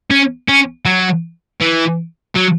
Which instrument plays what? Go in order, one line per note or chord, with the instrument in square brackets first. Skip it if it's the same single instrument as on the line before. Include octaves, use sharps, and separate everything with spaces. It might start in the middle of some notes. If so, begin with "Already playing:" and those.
[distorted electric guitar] C#4
C#4
F#3
E3
F#3